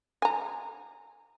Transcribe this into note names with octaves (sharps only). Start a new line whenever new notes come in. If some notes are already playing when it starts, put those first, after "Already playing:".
G#5 A#5